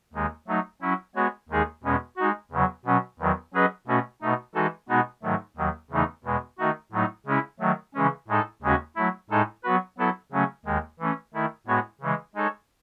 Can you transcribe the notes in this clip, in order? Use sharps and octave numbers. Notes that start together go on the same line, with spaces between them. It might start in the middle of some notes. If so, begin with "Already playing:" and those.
D#2 D#3 G#3
F#3 A3 D#4
F#3 C#4 E4
G#3 B3 F#4 C#5
D#2 D#3 G#3 D#4 G#4
E2 B2 G#3 C#4
G#3 D#4 F#4
E2 C#3 F#3
B2 F#3 C#4
E2 D#3 F#3
F#3 C#4 G#4 B4 D#5
B2 A3 C#4 F#4
B2 A3 D#4
E3 G#3 D#4 F#4 A4
B2 G#3 B3 D#4 F#4
G#2 D#3 F#3 A3
D#2 D#3 F#3
E2 C#3 E3 A3 D#4
E2 B2 G#3
D#3 A3 D#4 F#4
A2 F#3 A3 D#4
C#3 G#3 C#4 E4
D#3 F#3 A3
C#3 E3 G#3 C#4
A2 G#3 D#4 A4
D#2 C#3 G#3 C#4 F#4
F#3 A3 E4
A2 G#3 D#4 A4
F#3 B3 F#4 B4
F#3 B3 E4 A4
C#3 F#3 A3 C#4
D#2 D#3 G#3
E3 A3 C#4
D#3 A3 E4
A2 G#3 B3 F#4 C#5
C#3 E3 G#3
G#3 D#4 A4 C#5